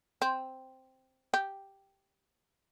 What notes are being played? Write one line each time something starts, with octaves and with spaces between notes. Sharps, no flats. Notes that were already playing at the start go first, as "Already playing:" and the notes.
C4
G4